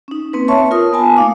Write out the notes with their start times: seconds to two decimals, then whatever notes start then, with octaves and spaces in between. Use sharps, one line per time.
0.08 C#4 D#4
0.33 A#3 C4 B4
0.48 C#5 E5 A5 C6 C#6
0.71 F4 A#4 D#6
0.93 B3 G#5 A5
1.17 A3 A#3 D#4 F5 D6